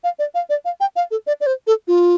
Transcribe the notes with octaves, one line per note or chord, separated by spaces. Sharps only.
F5
D5
F5
D5
F5
G5
F5
A4
D5
D5
C5
A4
F4